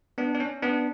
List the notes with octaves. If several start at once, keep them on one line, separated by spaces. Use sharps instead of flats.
B3 D4
D4
C#4
B3 D4